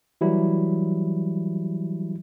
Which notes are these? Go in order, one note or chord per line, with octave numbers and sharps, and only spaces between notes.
E3 F#3 G3 E4